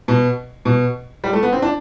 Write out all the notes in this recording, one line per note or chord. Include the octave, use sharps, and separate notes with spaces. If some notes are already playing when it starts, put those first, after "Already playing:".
B2
B2
G3
A3
B3
C4
D4